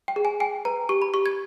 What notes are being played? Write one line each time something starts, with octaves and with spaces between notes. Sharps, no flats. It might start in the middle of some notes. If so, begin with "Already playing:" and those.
G5
G#4
G#5
G5 G#5
B4 A#5
G4 C#6
B5
G4 C#6
G#6